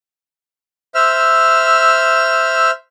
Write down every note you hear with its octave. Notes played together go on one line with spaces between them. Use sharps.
C5 E5 E6 F6